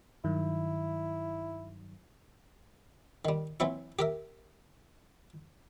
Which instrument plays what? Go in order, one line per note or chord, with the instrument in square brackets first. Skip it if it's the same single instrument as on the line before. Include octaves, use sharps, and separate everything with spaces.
[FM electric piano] G2 D#3 F#3 [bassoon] E4
[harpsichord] D#3 G3
E3 F#3 C4 E4
G4 A#4 E5